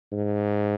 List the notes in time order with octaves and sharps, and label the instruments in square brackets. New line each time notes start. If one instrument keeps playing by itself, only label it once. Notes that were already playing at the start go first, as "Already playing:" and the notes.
[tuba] G#2